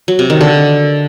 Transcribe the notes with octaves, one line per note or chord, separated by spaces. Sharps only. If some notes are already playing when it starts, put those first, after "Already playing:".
F#3
C3
D#3
D3